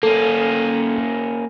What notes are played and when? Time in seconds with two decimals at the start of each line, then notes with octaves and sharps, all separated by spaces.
0.03 A#3 C#4 A4